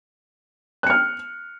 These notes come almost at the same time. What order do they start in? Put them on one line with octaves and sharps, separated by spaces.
F#6 C#7 F6